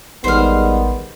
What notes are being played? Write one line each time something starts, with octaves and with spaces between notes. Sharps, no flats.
A1 G#2 D#3 G3 B3 C5 F6